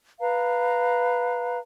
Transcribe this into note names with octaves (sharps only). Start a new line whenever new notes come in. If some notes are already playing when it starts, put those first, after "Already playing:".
B4 F5 A#5